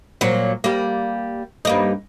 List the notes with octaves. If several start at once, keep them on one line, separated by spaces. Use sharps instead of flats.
A#2 F#3
G3 A#3
G2 A#3 D#4